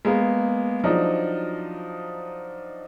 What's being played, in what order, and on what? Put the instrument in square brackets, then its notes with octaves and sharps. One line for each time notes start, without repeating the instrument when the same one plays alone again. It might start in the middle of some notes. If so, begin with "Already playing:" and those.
[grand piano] G#3 A#3 B3
F3 F#3 D4 D#4